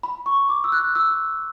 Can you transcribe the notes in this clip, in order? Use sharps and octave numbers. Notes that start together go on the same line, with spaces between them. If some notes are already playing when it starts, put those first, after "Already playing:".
B5
C#6
D6
E6
F#6
E6